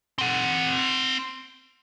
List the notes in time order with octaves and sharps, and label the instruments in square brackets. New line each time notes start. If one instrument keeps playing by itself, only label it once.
[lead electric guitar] C4 F#5